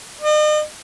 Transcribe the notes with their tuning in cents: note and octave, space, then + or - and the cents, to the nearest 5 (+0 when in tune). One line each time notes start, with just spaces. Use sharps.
D#5 -45